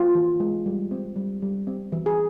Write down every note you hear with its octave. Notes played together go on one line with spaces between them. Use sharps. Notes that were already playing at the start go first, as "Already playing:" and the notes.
Already playing: F4
E3
G#3
G3
C4
G3
G3
C4
E3
G#4